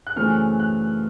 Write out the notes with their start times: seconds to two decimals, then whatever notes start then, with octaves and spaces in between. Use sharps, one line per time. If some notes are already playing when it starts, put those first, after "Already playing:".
0.07 F#6
0.16 F#2 C#3 E3 A3 C4 F6
0.60 F#6